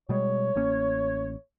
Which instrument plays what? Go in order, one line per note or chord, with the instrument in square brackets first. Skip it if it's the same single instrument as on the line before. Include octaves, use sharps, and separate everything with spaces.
[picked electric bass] B2 G3 G#3 [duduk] C#5
[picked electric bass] A1 A#3 C#4